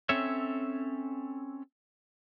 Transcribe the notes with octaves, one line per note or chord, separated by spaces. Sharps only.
C4 C#4 A4 C#5 E5